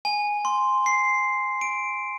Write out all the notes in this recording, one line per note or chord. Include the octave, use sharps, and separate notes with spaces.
G#5
C6
C7
D7